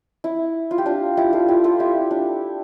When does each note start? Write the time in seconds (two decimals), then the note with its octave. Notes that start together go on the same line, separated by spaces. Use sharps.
0.24 E4
0.71 F4
0.78 G4
0.86 D4 F4
1.17 E4 G4
1.33 F4 A4
1.48 E4 G4
1.64 F4 A4
1.79 E4 G4
1.95 E4
2.11 D4